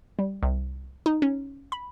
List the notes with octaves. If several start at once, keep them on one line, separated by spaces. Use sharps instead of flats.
G3
C2
D#4
C#4
B5